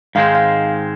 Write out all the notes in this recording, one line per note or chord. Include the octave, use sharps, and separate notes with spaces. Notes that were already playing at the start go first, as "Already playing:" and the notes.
G#2 D#3 G#3 C4 F5
F5